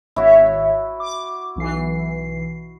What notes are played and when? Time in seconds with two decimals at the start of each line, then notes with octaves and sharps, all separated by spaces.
0.16 G#1 E4 F#4 C#5 E5
1.00 D6
1.56 B1 E3 C7